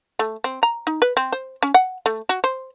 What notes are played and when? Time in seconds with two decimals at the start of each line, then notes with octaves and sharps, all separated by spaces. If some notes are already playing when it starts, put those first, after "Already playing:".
0.19 A3
0.44 C4
0.63 A#5
0.87 D#4
1.02 B4
1.17 C4
1.32 C5
1.63 C#4
1.74 F#5
2.06 A3
2.29 F#4
2.44 C5